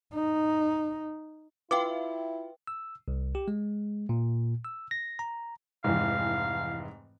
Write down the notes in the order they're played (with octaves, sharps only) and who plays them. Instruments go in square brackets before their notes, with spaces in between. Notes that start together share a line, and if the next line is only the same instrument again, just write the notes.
[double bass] D#4
[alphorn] E4 [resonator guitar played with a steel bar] F4 F5 [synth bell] B4 E5 G5 [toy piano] D6
[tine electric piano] E6
C2
G4
G#3
A#2
E6
A#6
A#5
[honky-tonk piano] F1 E3 [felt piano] G#2 [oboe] F5